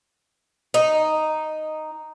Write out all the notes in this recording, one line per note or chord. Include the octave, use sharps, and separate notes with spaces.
D#4